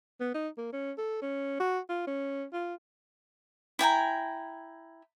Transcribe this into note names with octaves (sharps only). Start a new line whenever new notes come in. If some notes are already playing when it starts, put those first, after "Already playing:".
B3
D#4
A#3
C#4
A4
C#4
F#4
F4
C#4
F4
E4 G5 G#5 A#5